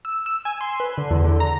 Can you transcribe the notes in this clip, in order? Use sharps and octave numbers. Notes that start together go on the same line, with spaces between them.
E6
E6
G#5
C6
B4
D3
E2
D3
A#5